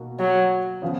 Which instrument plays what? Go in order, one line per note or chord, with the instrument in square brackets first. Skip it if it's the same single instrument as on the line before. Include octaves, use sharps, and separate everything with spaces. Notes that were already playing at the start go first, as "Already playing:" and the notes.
Already playing: [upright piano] B2 A#3 D#4 F#4
[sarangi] F#3
[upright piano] C#3 F3 B3